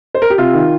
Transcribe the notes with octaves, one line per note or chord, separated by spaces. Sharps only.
C5
A#4
G4
C3 F4
D#3